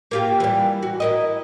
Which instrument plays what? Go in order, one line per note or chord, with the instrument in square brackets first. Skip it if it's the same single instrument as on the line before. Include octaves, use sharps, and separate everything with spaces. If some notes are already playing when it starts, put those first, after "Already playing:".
[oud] A#3 F4 G4
E3 G3
F#4
E4 A#4 D#5